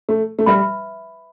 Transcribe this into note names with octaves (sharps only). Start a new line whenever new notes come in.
A3
A3
G3 B4 E5 B5